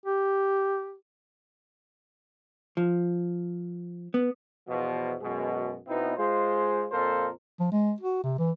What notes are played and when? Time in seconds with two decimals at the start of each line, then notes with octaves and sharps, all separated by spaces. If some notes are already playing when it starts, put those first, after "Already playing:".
0.06 G4
2.77 F3
4.14 B3
4.68 E2 B2 F3
5.21 F#2 B2 G#3
5.88 B2 B3 C4 D#4 E4
6.17 G#3 F4 C5
6.92 F2 A#2 F4 A4 A#4 C5
7.60 F3
7.72 G#3
8.00 F#4
8.24 C3
8.39 E3